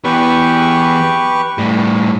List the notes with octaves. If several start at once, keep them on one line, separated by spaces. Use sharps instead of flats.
E3 B3 G4 B4 C#6
A2 G3